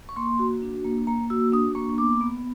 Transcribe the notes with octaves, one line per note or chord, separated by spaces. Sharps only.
C#6
A#3 C6
F#4
D4
A#3
A#3 A#5
F#4 E6
D4 D#6
A#3 C#6
B3 D6
B3